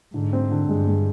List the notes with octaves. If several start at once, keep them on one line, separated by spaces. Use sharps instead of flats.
G#2 D3
C4
D3
G2 G#3
G#3